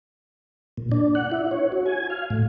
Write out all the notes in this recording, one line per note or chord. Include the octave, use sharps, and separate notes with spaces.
A#2
D4
F#5
E4
C#5
F#4
G#5
F5
A2